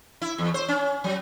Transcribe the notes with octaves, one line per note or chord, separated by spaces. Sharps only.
E4
E2
C5
C#4
F#3